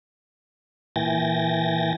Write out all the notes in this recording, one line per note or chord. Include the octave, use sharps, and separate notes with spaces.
A#2 E3 G5 G#5 A6 A#6